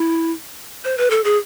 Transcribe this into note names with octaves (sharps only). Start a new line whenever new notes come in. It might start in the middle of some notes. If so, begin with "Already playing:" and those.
Already playing: E4
C5
B4
A4
G#4